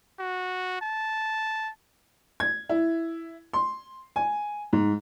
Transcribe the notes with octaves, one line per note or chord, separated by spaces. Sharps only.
F#4
A5
G#6
E4
C6
G#5
G#2